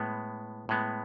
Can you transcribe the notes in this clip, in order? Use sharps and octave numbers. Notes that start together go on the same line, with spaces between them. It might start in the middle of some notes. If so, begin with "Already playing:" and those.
Already playing: A2 G#3 B3
A2 G#3 B3